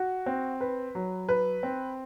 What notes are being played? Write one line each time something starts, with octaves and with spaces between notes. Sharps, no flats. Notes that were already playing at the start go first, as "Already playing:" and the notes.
Already playing: F#4
C4
B4
F#3
B4
C4